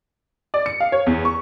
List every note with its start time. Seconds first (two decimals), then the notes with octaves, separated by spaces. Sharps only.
0.54 D5
0.66 C#7
0.80 F5
0.92 C#5
1.07 E2
1.25 C#6